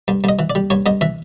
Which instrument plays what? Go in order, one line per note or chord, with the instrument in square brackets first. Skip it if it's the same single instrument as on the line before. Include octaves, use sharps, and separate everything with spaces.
[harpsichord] G2
G2 D#5
E3
D5
G3
G2 C#5
G2 D#5
E3 E5